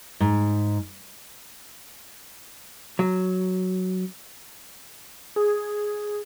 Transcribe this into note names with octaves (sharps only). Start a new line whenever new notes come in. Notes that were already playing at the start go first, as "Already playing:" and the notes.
G#2
F#3
G#4